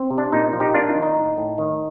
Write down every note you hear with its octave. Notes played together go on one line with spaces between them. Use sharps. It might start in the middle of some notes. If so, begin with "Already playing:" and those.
Already playing: C4
C3
D4
A#2 D#4
F3
D#4 G4
A#3 D4 F4
D#4
D#3
D#4
A2
A2
D#3